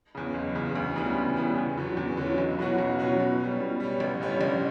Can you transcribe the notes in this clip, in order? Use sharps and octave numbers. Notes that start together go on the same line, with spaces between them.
E2 C#3
F#1
E2 C#3
D2
C#3 E3 G3 B3
D2
C#3 E3 G3 B3
E2
D3 F#3 C#4
E2
D3 F#3 C#4
B1
B2 F#3 C#4 F#4
B1
B2 F#3 C#4 F#4
B2
G3 C#4
B2
G3 C#4
A1
G2 D3 G3 C#4
A1